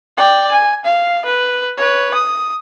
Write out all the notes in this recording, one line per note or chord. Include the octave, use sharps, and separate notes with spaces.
D5 G5
G#5
F5
B4
B4 C#5
D#6